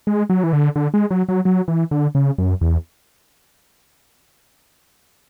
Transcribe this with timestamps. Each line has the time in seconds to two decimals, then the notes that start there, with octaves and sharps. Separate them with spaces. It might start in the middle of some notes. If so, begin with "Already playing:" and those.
0.07 G#3
0.30 F#3
0.43 E3
0.53 D3
0.76 D3
0.94 G#3
1.11 F#3
1.28 F#3
1.45 F#3
1.68 E3
1.91 D3
2.15 C#3
2.38 F#2
2.61 E2